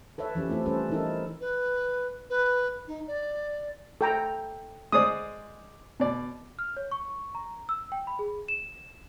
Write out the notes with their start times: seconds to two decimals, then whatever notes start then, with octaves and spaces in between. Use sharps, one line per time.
0.18 A4 B4 C#5 E5
0.35 E3 F3 C#4 G4
0.49 A3 C4 E4 A4
0.66 G3 C#4 A4 B4 C5
0.90 E3 C#4 D#4 E4 A4 A#4
1.41 B4
2.30 B4
2.87 D#4
3.07 D5
4.01 A4 G5 A#5
4.92 G#3 C5 D5 D#6
6.00 B2 D5
6.59 F6
6.77 C#5
6.91 C#6
7.35 A#5
7.69 E6
7.92 G5
8.07 B5
8.19 G#4
8.48 E7